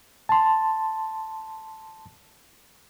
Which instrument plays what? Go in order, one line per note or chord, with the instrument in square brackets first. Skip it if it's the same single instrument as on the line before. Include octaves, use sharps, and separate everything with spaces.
[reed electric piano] A5 C6